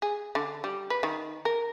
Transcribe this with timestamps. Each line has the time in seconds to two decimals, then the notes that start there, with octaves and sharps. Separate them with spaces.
0.02 G#4
0.35 D3
0.64 G3
0.90 B4
1.03 D#3
1.45 A#4